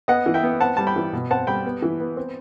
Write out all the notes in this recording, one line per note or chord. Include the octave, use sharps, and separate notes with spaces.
B3 D#5 F#5
E3
E5 G5
B3
C4 F#5 A5
G3 A5
G5 B5
E3
B2
C4 F#5 A5
G3 G5 B5
B3
E3
B3
C4